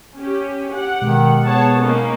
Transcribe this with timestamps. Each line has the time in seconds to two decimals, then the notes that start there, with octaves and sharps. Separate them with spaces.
0.15 C#4 G4
0.71 G4 F#5
1.02 B2 D#3 G#3
1.47 B3 G#4 C#5 A5
1.80 A#3 C#4 D#4